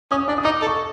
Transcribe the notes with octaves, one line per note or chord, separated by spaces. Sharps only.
C#4 D#6
D4 D6
D#6
D#4 D6
A4
C#6